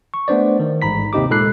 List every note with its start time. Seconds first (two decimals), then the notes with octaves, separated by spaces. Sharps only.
0.14 C#6
0.28 A3 B3 D4 C5 D5
0.60 D#3
0.82 A1 G#2 A#5 B5 B6
1.13 D#2 C3 C4 D#4 G4 D6
1.31 A#2 G#3 A4 B5 F#6 C7